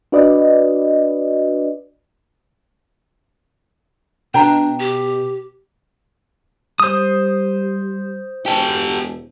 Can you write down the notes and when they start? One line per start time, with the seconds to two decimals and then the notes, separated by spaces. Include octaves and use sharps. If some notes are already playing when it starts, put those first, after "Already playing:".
0.12 D4 F#4 B4 D5 D#5
4.34 B2 D4 G5 A#5
4.80 G4
6.80 G3 C5 D#6
8.46 E1 G4 A4